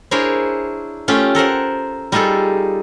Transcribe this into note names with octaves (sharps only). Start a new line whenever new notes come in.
D4 E4 G#4 A#4 C5 C#5
A3 C#4 F4 G4
A4 A#4 C5 F#5
G3 D#4 F4 G#4 A4